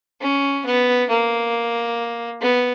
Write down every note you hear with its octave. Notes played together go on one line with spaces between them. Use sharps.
C#4
B3
A#3
B3